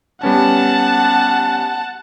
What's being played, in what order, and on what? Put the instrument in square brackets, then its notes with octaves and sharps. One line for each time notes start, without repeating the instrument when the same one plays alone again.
[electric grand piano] G3 B3 C#4 [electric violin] F#5 A5